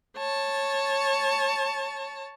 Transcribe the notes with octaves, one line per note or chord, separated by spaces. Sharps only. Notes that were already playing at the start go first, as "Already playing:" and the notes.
C#5 A5